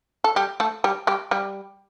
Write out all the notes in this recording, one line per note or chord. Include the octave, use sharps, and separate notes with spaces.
A4
G3 G4
A3 A4
G3 G4
G3 G4
G3 G4